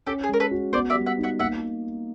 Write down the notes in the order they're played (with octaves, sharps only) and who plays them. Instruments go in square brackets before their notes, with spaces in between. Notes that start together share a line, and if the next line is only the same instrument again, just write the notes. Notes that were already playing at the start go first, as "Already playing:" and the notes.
[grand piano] C#4 [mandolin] G4 A4
[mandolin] G#4
[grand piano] G#3 [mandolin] A#4
[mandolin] A4 B4
[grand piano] F#4
[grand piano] B3 [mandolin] C5 D5
[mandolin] D5 E5
[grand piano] G3
[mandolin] E5 F#5
[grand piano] D#4
[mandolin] E5 F#5
[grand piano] A#3 [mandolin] E5 F#5